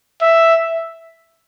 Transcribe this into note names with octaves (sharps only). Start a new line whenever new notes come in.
E5